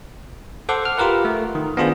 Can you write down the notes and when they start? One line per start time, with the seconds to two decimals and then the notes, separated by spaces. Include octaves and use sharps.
0.69 A4 C5 F#5 C6 D6
0.85 F6
0.98 F4 G4 A#4 B4 F#5
1.25 A3
1.55 D#3
1.77 B3 D4 F4 G#4 C5